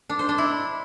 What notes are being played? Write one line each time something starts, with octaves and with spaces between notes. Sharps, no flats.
D4
C5
D4
E4